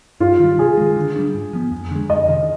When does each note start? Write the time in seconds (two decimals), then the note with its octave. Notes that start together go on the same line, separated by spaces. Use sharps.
0.20 G2 F4
0.39 D#3 G3
0.58 C3 G#4
0.77 D#3 G#3
0.96 D3
1.16 G3 D4
1.34 G#2
1.53 F3 B3
1.72 F2
1.91 D3 G#3
2.10 F2 D#5
2.28 C3 D#3